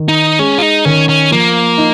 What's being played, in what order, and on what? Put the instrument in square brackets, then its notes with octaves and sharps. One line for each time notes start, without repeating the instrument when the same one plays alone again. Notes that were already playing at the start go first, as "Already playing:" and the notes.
Already playing: [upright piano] D#3
[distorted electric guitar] D#4
[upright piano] G#3 [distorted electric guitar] C#4
[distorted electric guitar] F4
D#4
[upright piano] D#3 [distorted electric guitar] C#4
[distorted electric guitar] C#4
[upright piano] F3 [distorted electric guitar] A#3
[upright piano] D#4